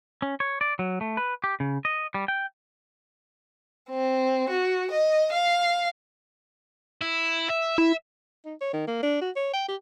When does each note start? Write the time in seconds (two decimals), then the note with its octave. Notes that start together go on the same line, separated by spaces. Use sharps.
0.22 C#4
0.40 C#5
0.61 D5
0.79 F#3
1.01 A3
1.17 B4
1.44 G4
1.60 C#3
1.85 D#5
2.14 G3
2.28 G5
3.91 C4
4.50 F#4
4.91 D#5
5.33 F5
7.01 E4
7.50 E5
7.78 E4 E5
8.45 D#4
8.61 C#5
8.73 D#3
8.88 A#3
9.03 D4
9.21 F#4
9.36 C#5
9.54 G5
9.68 G4